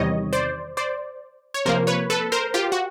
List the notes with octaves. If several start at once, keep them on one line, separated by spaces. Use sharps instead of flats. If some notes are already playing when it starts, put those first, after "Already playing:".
Already playing: E2 C3 D#3 G3 C#5 D#5
C5 D5
C5 D5
C#5
C3 F3 A#3 A#4 C5
B4 C#5
A4 B4
A#4 C5
F4 G4
F#4